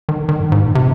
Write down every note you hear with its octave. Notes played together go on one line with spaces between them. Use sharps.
D#3
D#3
G2
G#2
A#2
C3